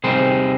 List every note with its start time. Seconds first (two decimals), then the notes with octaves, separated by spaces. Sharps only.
0.04 C3 G3 C4 D#4 G#4 C5